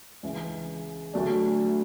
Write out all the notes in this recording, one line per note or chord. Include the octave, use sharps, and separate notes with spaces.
C#2 C#3 E3
D2 D3 F#3 A3 D4